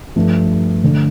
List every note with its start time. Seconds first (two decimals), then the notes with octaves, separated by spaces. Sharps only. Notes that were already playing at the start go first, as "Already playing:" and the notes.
0.16 G2 F3 A3
0.82 D3 A3